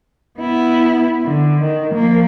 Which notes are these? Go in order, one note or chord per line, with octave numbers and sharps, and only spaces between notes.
B3 E4
D3
D#3
F3 A#3